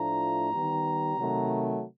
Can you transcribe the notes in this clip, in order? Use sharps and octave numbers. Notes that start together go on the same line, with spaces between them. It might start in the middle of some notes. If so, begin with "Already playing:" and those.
Already playing: A2 F3 A3 D4 F4 A#5
D#3 G3 B3
C3 D#3 F#3 A3